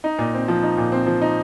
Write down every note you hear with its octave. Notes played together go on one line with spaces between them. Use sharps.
D#4
A#2
C4
F3
D#4
A#2
C4
F3
D#4